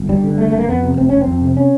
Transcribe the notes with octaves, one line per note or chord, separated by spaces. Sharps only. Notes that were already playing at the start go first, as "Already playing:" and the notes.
Already playing: G1
G2 G3
D3
G1 A3
A3
G1 A#3
F2 B3
C3
F1 C4
F1 C#4
C4
F2
C3
C#4